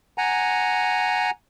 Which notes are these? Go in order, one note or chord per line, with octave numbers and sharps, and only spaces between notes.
F#5 G#5 A#5